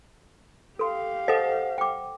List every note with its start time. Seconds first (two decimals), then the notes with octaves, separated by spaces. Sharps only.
0.79 G4 A4 F5 C6
1.28 A4 C5 D#5 F#5
1.78 G5 D6